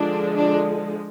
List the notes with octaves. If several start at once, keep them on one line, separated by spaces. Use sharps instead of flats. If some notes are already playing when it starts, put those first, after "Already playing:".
Already playing: D3 F3 G#3 D4
D4